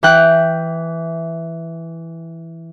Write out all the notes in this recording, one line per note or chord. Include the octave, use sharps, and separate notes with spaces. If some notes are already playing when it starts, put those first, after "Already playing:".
E3 G5 F#6